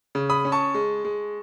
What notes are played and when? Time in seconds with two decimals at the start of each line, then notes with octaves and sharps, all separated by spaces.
0.15 C#3
0.30 B5 D#6
0.45 C#4
0.52 A5 C#6
0.74 G#3
1.05 G#3